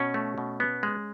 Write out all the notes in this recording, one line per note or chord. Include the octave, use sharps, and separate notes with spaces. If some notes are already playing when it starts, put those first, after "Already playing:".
Already playing: B2 C#4
A3
B2
B3
G#3